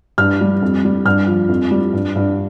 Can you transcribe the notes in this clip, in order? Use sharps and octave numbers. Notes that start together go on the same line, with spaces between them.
G2 F6
G3
F2
G3
G2 F6
F3
F2
G3
G2
G2